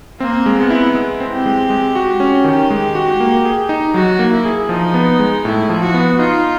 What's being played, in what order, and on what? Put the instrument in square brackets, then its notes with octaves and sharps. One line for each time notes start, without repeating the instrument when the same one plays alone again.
[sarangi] A#3 [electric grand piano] C4
[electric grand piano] G#3
[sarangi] B3
[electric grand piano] E4
G#3
C4
[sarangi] G4
[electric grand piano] G#3
G#3
F#4
C#4
[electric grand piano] D#3 [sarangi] G4
[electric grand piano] G#3
F#4
A#3
G#4
D#4
[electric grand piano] F#3 [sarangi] F#4
[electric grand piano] A#3
[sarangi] E4
[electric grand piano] G#4
[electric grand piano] F3 [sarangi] D#4
[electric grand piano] B3
G#3
[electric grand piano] A2 [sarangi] E4
[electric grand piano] F3
[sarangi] F#4
[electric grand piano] B3
[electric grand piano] D#4 [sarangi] F4